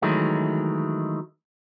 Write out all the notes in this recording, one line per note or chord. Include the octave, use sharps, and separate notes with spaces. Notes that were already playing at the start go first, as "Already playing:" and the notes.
D#3 E3 F#3 G#3 A3